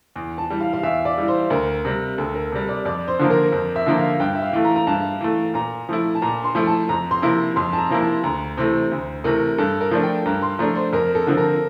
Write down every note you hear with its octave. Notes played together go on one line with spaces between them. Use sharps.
E2
A5
E3 G3
F5
F5
E2 E5
D5
E3 G3
C5
D2 A#4
C3 G3
D2 A4
A#4
C3 G3
D5
F2 D5
C5
D3 F3 A#3
A#4
F2
E5
D3 F3 A#3
F5
G2 G5
E5
F5
E3 A3
A#5
A#5
G2 A5
E3 A3
A#2 A#5
F3 A3 E4
A5
A#2 A#5
C6
F3 A3 E4
A5
F2 A#5
C6
C3 F3 A#3 E4
F2 C6
A5
A#5
C3 F3 A#3 E4
A5
D2 A#5
C3 E3 A3 C5
D2
C3 E3 A3 A#4
G2 A4
A#4
F3 A3 D4
G5
G2 A#5
C6
F3 A3 D4 A#5
C5
F2 A#4
A4
D3 F3 C4
A#4